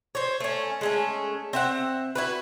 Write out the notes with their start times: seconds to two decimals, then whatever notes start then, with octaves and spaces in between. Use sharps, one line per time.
0.15 C5 C#5
0.40 A3 C#4
0.81 G#3 A3 C#4
1.53 C4 E5 F#5
2.15 E4 F#4 B4